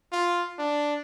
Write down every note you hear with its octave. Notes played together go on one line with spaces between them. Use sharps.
F4
D4